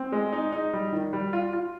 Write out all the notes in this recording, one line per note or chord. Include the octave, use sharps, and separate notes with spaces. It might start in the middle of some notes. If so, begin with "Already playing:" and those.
Already playing: C4
G#3
D#4
D#4
G3
D#3
G3
F4
F4